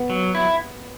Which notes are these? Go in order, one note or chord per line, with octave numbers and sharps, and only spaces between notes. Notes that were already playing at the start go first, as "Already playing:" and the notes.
Already playing: B3
F#3
E4